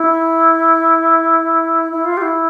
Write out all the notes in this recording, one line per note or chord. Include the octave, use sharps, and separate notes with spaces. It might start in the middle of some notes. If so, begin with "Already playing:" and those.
Already playing: E4
E4
F4
G4
E4